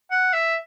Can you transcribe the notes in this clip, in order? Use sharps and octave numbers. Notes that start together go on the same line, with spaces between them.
F#5
E5